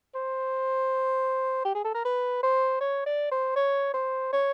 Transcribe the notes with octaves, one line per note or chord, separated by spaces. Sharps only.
C5
G4
G#4
A4
A#4
B4
C5
C#5
D5
C5
C#5
C5
C#5